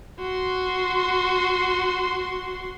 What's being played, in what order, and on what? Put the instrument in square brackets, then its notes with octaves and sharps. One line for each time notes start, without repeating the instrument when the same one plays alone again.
[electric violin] F#4 C6